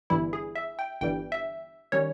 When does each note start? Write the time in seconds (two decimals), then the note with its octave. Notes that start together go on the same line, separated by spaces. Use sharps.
0.10 G1 G2 E3 G3 E4
0.33 G#4
0.55 E5
0.79 G5
1.01 G1 G2 E3 G3 G5
1.32 E5
1.92 D#3 G3 C#4 C#5